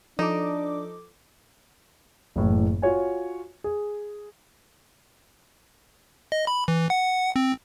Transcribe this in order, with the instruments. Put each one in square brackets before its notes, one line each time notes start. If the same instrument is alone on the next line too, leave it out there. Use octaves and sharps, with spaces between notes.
[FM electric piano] F3 A4 D6 [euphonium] D4 [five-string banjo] D#4
[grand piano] F#1 A2 E3
F4 F#4 C#5 G#5
G#4
[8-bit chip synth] D#5
B5
E3
F#5
C4